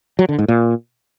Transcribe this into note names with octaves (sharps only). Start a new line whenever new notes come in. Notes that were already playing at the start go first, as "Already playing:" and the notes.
F#3
D3
G#2
A#2